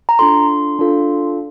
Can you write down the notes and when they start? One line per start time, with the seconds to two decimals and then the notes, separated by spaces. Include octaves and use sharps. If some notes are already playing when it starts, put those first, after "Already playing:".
0.09 A#5
0.19 D4 F4 A4 C6
0.79 D4 F4 A4